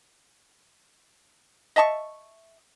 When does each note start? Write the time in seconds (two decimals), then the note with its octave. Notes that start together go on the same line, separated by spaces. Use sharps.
1.76 D#5 E5 A5 C#6